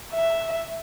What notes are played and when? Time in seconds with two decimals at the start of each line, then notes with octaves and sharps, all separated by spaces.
0.13 E5